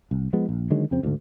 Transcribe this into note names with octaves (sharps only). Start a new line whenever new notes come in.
C2
F3 G#3 B3
A#1
D3 D#3 F#3 G#3
F2 C#3 C4
D2 G#2 D3